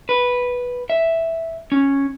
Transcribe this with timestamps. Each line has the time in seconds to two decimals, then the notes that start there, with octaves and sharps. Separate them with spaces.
0.09 B4
0.90 E5
1.72 C#4